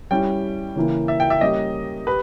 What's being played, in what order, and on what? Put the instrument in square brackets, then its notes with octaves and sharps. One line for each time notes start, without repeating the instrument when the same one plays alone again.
[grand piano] G3 C#4 E4 G4 [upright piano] G5
[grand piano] C#3 E3 A#3 E4
[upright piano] E5
G5
E5
[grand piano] G3 A#3 C#4 G4 [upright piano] D#5
[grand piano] G4 [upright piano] B4